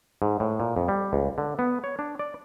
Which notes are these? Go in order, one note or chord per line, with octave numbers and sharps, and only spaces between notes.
G#2
A2
A#2
F2
G3
C#2
D3
B3
C#5
D4
D5